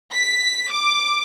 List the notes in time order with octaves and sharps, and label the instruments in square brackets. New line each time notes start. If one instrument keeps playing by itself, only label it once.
[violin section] B6
D6